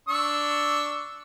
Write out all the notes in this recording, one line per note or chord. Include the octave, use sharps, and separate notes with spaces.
D4 C#6 E6